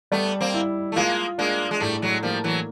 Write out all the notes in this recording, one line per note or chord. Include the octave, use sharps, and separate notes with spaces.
G3 A3 B3
A#3 C4
E4
A3
G#3 A#3 F4
G#3 A#3 D4
G#3
A2 G3 A3
F#3 G#3
F3 G3 A#3
E3 F#3